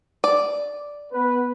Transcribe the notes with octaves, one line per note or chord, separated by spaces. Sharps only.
D5
B3 B4